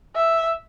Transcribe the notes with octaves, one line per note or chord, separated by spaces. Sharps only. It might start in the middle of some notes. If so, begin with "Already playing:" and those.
E5